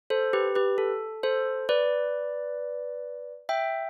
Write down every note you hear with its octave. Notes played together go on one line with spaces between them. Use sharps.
A4 C5
G4 B4
G4 B4
A4
A4 C5
B4 D5
E5 G5